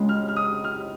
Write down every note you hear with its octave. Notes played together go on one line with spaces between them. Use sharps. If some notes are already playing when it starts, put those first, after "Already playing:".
Already playing: C#2 C#3 G#3
F6
F6
D#6
F6